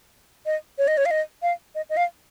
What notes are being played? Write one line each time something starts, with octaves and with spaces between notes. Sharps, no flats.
D#5
C#5
D#5
C#5
F5
D#5
F5
D#5
D#5
F5